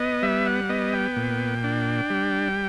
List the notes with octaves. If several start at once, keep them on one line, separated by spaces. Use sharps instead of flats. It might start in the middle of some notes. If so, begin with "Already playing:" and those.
Already playing: B3 D#5
G3 E5
F#5
B3 D#5
G5
A#2
D4
G3